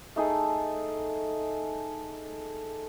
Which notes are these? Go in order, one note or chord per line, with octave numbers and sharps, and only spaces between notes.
A3 D#4 G#4 A4